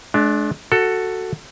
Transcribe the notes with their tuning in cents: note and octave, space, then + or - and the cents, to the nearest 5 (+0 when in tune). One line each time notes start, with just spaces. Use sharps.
G#3 +45 D4 +0
F#4 +0 A4 +10